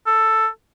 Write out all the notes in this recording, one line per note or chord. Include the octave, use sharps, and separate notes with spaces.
A4